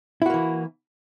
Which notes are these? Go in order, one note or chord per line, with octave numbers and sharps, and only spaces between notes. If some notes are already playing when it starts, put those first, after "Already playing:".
E3 A#3 E4 F#4